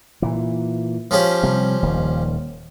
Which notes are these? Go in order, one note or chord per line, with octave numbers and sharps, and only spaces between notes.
A#2 E3
F3 C#4 G4
C3 G3
D#1 D#2